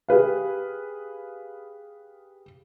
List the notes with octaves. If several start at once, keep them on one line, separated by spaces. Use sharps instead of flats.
G4 G#4 B4 F5